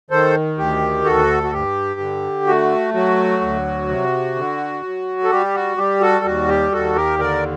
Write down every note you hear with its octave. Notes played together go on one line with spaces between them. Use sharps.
D#3 A4 C5
D2 G4
D2 F#4 A4
F#4
G2 G4
D3
A3 F#4
F#3 F#4
D2
C3
D3
F#3
A4
G3 G4
F#4
G3 G4
F#4 A4
D#2 F#4
G4
D#2 F#4 A4
G4 A#4
D3 A#4 D5